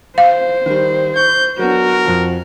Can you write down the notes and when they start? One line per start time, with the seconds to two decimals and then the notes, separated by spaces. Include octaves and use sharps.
0.18 C5 F5
0.66 D#3 G3
1.16 C#6 G6
1.59 F#3 B3 D4 F#4 A#4
2.05 F2 F3